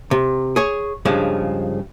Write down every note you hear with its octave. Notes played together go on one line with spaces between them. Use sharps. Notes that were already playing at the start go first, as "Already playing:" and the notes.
C3
G#4 C#5
G2 C#3 F3 G#3